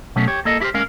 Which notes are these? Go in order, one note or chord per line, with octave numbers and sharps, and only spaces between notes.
B2 F#3 A3 C#4
G4 C#5
A#3 A4 D#5
E4 G4 G#4 A#4 C5
G#3 C#4 A#4 F5